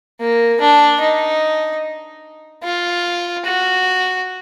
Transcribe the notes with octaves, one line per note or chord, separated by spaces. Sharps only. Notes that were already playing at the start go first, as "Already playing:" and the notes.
A#3
D4
D#4
F4
F#4